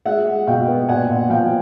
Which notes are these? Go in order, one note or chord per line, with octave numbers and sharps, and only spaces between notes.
G#3 E5 F#5
G#3
B2 F5 G5
B3
A#2 F#5 G#5
A#2
F3 F5 G5